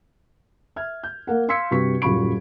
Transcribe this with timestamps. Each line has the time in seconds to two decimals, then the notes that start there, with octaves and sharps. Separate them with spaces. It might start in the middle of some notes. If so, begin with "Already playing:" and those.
0.76 E5 F6 G#6
1.03 G6
1.27 A#3 A#4 F#5
1.48 F5 C6 E6 G#6 B6 C#7
1.71 G2 C3 F#4 B4 C#6 B6
2.02 D#1 F#2 F4 B5 C#6 D7